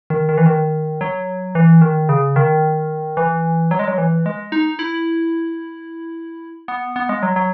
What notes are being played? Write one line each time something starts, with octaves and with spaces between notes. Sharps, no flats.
D#3
D#3
E3
D#3
F#3
E3
D#3
C#3
D#3
E3
F#3
G#3
F#3
E3
G#3
D#4
E4
B3
B3
G#3
F#3
F#3